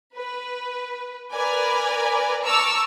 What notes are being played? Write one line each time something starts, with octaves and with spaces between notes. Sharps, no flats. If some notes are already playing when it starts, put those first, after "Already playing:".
B4
A#4 B4 D5 G#5
A5 A#5 C#6 D6 E6 F6